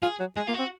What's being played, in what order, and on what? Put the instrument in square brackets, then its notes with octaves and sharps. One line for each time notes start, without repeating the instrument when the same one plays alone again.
[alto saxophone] F4 [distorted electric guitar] G#4
[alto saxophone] F#3
[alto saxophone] G#3 [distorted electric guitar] G#4
[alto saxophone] A#3 [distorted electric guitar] F4
[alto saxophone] C4 [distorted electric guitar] F#4